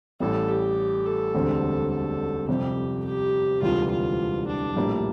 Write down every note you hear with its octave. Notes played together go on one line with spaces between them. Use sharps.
A1 A2 G3 A4
G4
A4
E1 D2 D3 G3 C4
A4
F2 C3 G3 G4
G4
E1 D2 C3 E3 G3 F4
F4
D4
A#1 A2 G3 A#3